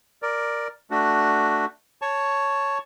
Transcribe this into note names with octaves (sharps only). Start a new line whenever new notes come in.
A#4 D5
A3 D4 F#4
C#5 A5 C#6